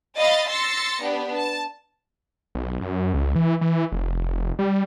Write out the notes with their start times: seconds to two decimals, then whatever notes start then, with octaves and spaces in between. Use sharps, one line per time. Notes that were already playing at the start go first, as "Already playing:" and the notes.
0.18 D#5 F5 B5 A6
0.49 C6 E6 A6 A#6 C#7
1.01 B3 D4 G4
1.35 A5
2.55 B1
2.81 F#2
3.14 C#2
3.35 E3
3.61 E3
3.92 F1
4.59 G3